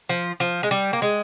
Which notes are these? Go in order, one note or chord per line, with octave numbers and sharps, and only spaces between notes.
F3
F3
G#3
G3
A#3
G#3